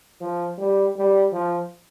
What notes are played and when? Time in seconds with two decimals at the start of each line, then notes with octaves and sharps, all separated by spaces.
0.21 F3
0.58 G3
0.96 G3
1.32 F3